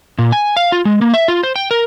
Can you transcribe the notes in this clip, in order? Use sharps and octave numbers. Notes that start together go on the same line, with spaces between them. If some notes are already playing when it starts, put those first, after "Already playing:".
A#2
G#5
F5
F4
G#3
A#3
E5
F4
C5
G5
A#4